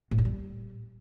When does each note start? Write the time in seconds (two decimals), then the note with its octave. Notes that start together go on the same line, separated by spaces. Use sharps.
0.11 A2
0.18 G2
0.25 G3